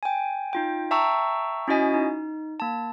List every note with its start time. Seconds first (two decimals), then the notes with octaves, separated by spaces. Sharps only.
0.03 G5 G#5
0.53 D#4 F4 G5
0.91 E5 G5 A5 A#5 C#6 E6
1.68 C#4 E4 F#4 D#5 G#5
1.94 D#4
2.60 A#3 A5